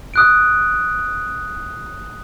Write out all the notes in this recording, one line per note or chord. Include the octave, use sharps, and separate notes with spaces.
D#6 F#6 D7